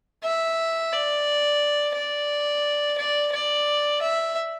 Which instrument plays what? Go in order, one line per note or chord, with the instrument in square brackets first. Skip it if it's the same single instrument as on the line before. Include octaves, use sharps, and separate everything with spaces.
[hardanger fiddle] E5
D5
D5
D5
D5
E5